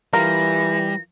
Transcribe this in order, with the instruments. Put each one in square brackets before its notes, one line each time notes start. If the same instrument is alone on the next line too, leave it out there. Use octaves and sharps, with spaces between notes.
[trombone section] E3 [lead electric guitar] G3 [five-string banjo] F4 A#4 [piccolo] A#6